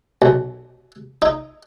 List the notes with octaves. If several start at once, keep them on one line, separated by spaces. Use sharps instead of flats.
B1
D#4